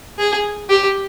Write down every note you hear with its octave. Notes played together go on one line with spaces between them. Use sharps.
G#4
G4